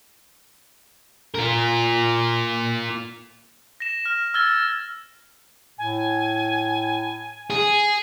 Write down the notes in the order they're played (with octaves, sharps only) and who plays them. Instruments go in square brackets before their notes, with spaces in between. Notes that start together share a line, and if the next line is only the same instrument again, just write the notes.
[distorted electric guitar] F4 A#4
[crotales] A#6 E7
F6 A#6
E6 F6 G#6 A6 G7
[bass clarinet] A2 [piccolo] G#5
[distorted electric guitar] G#4